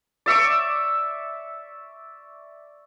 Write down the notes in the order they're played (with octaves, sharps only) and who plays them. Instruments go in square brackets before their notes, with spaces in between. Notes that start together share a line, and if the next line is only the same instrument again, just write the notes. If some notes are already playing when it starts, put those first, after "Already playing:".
[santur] D5 E5 C#6 D6